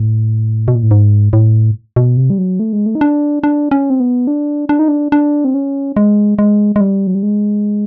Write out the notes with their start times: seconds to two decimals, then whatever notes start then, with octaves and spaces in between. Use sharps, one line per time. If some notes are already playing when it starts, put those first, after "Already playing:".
Already playing: A2
0.68 B2
0.75 A#2
0.83 A2
0.91 G#2
1.33 A2
1.96 B2
2.17 C3
2.30 G3
2.38 F#3
2.60 A3
2.73 G#3
2.86 A3
2.95 D#4
3.01 D4
3.43 D4
3.71 C#4
3.90 C4
4.00 B3
4.27 D4
4.69 D4
4.79 D#4
4.88 D4
5.12 D4
5.45 C4
5.54 C#4
5.96 G#3
6.39 G#3
6.76 G#3
6.80 G3
7.07 F#3
7.15 G3
7.23 G#3